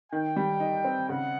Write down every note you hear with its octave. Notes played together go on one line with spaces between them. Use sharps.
D#3 G5
G3
D#4
C4
C#3 F#5